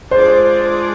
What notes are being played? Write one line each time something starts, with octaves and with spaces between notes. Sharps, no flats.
G#3 D4 F4 G#4 C5 D5